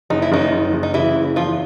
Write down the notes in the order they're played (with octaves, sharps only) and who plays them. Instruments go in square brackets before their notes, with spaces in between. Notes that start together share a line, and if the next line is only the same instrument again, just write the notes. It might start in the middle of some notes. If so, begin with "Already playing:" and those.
[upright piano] F#1 [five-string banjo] D#4
[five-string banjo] E4
[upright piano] F#1 [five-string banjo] D#3 D#4
[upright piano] F#1
F#1
[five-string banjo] D#4
[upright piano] C#3 [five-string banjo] E3 E4
[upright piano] F#1
[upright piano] E2 [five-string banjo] F3 F4